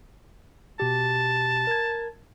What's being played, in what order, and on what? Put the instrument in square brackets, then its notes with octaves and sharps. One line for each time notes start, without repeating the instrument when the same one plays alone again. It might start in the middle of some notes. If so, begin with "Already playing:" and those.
[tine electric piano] B2 G4 [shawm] A5
[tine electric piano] A#4 G#6